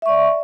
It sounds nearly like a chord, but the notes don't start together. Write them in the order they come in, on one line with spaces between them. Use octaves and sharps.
E5 C#6 D5